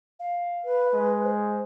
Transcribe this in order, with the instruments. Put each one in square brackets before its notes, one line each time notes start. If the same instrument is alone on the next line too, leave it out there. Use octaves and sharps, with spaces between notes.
[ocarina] F5
[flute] B4
[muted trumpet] G#3
[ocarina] C5